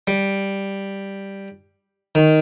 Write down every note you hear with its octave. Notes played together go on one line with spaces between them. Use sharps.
G3
D#3